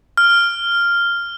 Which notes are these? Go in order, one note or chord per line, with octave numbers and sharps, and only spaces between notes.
F6